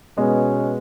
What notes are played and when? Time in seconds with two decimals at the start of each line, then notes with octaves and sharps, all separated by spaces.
0.18 B2 G#3 B3 C#4